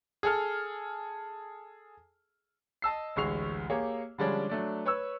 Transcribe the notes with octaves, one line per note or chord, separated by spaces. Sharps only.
G#4 A4 F6
D#5 A5 E6 C7
A1 D2 G#3 C#6 C7 F7
A#3 G4 G#4 C#5
D3 F3 G3 G#3 C#4 D4
F#3 A3 D4
B4 C#5 C#6 E6